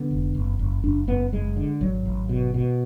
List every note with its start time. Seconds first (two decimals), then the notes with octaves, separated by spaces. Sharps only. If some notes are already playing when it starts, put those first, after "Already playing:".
Already playing: D3 B3
0.11 F1
0.35 F#1
0.59 F#1
0.83 F#1 D4
1.08 F#1 B3
1.32 F#1 G#3
1.57 D3
1.81 G#1 F#3
2.06 G#1
2.29 B2
2.54 B2